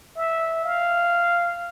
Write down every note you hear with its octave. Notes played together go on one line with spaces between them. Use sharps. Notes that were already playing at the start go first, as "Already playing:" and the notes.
E5
F5